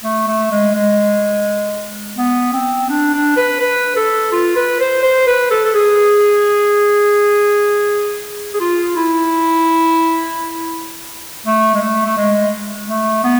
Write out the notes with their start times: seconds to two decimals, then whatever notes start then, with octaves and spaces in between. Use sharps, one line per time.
0.04 A3
0.27 A3
0.51 G#3
0.75 G#3
2.18 B3
2.53 C4
2.89 D4
3.13 D4
3.37 B4
3.60 B4
3.96 A4
4.32 F4
4.56 B4
4.80 C5
5.03 C5
5.27 B4
5.51 A4
5.65 A4
5.74 G#4
8.54 G#4
8.60 F4
8.96 E4
11.46 A3
11.74 G#3
11.81 A3
12.05 A3
12.17 G#3
12.89 A3
13.24 B3